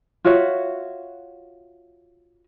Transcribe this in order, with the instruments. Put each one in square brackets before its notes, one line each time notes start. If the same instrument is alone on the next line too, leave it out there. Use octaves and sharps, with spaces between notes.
[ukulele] F4 F#4 C#5 E5